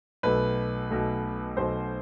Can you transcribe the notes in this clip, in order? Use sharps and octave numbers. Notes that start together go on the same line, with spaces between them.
B1 B2 A3 B4
B1 B2 A3
B1 B2 A3 C5